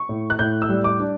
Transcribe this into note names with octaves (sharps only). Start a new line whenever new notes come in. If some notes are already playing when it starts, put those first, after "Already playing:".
Already playing: C#6
A2
F#6
A2 G6
E6
G3
D6
D4